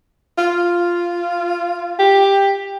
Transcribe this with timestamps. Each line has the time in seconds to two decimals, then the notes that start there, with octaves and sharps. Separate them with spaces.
0.38 F4
1.99 G4